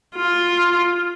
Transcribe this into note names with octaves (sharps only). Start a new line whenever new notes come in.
F4